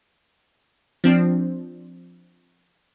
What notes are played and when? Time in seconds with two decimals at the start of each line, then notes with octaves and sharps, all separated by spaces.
1.04 F3 C4 D4